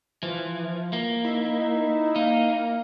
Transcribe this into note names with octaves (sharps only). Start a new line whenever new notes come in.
E3 F3
A#3
D#4 E4
D#4
A#3 D#4 F5